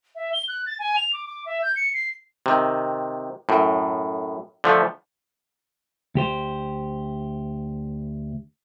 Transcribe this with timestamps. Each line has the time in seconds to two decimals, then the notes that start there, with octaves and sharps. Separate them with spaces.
0.15 E5
0.33 G7
0.48 F#6
0.66 A6
0.79 G#5
0.96 F7
1.13 D6
1.26 D6
1.46 E5
1.62 G6
1.76 C#7
1.94 C7
2.46 C3 D#3
3.49 F#2 A2
4.64 D3 F3 A3
6.15 D2 G4 C5